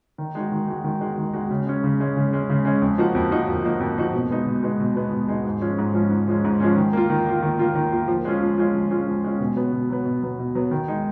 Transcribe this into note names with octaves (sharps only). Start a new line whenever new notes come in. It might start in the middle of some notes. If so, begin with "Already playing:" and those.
D#3
G#3 D#4 F#4
D#3
G#3 D#4 F#4
D#3
G#3 D#4 F#4
D#3
G#3 D#4 F#4
C#3
G#3 C#4
C#3
G#3 C#4
C#3
G#3 C#4
C#3
G#3 C#4
F2
F3 A#3 D#4 F#4
F2
F3 A#3 D#4 F#4
F2
F3 A#3 D#4 F#4
F2
F3 A#3 D#4 F#4
B2
G#3 B3 D#4 F#4
B2
G#3 B3 D#4 F#4
B2
G#3 B3 D#4 F#4
B2
G#3 B3 D#4 F#4
G#2
F3 G#3 C#4
G#2
F3 G#3 C#4
G#2
F3 G#3 C#4
G#2
F3 G#3 C#4
D#3
A#3 F4
D#3
A#3 F4
D#3
A#3 F4
D#3
A#3 F4
F3
G#3 C#4 F4
F3
G#3 C#4 F4
F3
G#3 C#4 F4
F3
G#3 C#4 F4
B2
F#3 B3
B2
F#3 B3
B2
F#3 B3
B2
F#3 B3
D#3
G#3 D#4